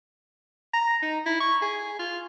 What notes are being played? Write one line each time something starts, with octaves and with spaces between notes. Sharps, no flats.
A#5
D#4
E4
C#6
G#4
F4